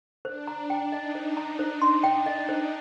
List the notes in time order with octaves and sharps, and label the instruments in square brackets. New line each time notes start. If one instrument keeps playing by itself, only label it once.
[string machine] D4 [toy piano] C5
[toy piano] A#5
G5
[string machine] D#4 [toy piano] D#5
[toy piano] C5
A#5
C5
C6
G5
D#5
C5